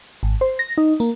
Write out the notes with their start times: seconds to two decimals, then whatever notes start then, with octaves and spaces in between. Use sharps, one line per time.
0.23 G#1
0.41 C5
0.59 A#6
0.78 D#4
1.00 A#3